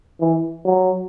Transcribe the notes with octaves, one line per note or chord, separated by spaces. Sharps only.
E3
F#3